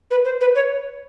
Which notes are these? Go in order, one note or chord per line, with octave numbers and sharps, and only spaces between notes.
B4
C5
B4
C#5